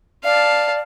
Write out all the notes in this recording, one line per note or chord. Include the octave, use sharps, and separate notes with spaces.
D5 F5 A5